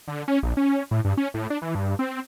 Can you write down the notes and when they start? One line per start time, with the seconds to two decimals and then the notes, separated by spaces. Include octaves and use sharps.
0.08 D3
0.28 C#4
0.43 A#1
0.57 C#4
0.91 A2
1.05 G2
1.17 C#4
1.34 A2
1.50 D4
1.62 E3
1.75 G2
1.99 C4